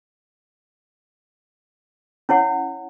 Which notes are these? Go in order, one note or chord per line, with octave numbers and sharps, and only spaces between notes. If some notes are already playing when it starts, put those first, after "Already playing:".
C#4 E4 C#5 F#5